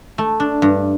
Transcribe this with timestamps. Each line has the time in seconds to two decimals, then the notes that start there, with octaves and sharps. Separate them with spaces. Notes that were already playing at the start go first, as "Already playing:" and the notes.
0.18 A3
0.40 D4
0.62 G2